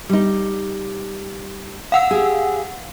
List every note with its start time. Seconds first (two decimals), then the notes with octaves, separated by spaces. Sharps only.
0.09 G3 D#4
1.92 F5 F#5 E6
2.11 G4 G#4